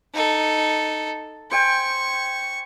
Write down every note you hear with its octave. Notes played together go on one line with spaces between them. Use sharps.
D#4 A4
C5 G5 G#5 C#6